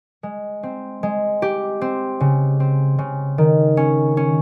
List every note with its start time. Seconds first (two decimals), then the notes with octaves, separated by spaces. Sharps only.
0.23 G#3
0.63 C4
1.03 G#3
1.42 G4
1.81 C4
2.20 C#3
2.60 C4
2.98 C#3
3.38 D#3
3.77 C#4
4.17 C#4